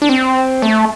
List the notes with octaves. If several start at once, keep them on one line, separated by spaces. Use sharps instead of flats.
D4
C4
A3